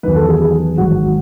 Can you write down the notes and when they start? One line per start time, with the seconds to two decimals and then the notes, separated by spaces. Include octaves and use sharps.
0.03 E2 D#3 F#3 B4
0.16 A4
0.29 G#4
0.40 G#4
0.78 G#1 G#2 F#3 F#4